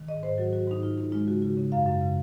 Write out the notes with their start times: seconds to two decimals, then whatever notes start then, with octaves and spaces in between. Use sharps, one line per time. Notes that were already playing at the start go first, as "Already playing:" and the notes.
Already playing: D#3
0.08 G#2 D#5
0.23 G#2 C5
0.38 F#3 F#4
0.53 G#2 F#4
0.67 G#2 D#4
0.83 G#2 F4
0.98 G#2 D#4
1.12 G#3 F4
1.28 C#3 F#4
1.42 C#3 F#4
1.57 C#3
1.72 F#2 F5
1.86 F#2
2.01 C#3